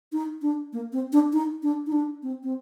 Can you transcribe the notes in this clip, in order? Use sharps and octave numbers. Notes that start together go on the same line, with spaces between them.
D#4
D4
A#3
C4
D4
D#4
D4
D#4
D4
C4
C4